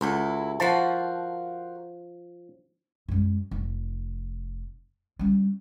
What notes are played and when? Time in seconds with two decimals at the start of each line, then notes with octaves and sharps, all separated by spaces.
0.01 C#2 F#3 E4 A4
0.60 F3 F#4 A#4 C5 A5
3.09 F#2 G#3
3.51 F1
5.19 G3 C#4